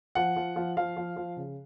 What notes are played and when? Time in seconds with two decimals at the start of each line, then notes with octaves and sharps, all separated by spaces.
0.15 F3 F#5
0.36 F3
0.56 F3
0.77 F3 F5
0.97 F3
1.16 F3
1.37 C#3